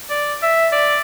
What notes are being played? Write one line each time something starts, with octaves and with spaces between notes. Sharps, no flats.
D5
E5
D5